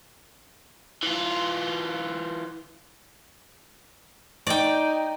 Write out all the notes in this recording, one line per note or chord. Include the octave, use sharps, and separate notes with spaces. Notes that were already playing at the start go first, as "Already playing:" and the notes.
E3 F4
D#4 D5 G5